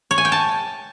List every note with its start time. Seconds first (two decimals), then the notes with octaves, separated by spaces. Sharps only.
0.11 C#5
0.18 G#5
0.25 G5
0.32 A5